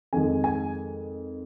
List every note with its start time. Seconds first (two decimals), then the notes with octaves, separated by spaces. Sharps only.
0.13 F2 D#3 G#3 G#5
0.44 G#5